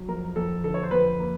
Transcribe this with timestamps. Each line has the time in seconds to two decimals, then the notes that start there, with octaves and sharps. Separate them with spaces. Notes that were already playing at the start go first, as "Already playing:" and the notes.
Already playing: F#3
0.09 F2 A#4
0.36 F2 A4
0.64 D3 A4
0.74 C#5
0.83 C5
0.91 F2 B4
1.19 A#3